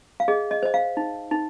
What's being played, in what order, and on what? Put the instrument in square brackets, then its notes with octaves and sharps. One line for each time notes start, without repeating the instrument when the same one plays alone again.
[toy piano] F5
G#4 D#5
D#5
C5 D#5
F5
D#4
D#4